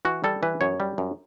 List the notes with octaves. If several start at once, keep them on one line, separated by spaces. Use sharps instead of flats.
E3 F#4
G3 A4
E3 B4
F#2 C#5
G3
F#2